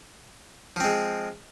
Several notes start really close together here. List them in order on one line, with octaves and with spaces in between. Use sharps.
F3 C4 G#3